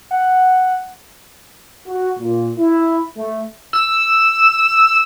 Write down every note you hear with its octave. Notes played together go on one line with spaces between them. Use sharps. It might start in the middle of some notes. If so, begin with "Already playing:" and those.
F#5
F#4
A#2
E4
A3
E6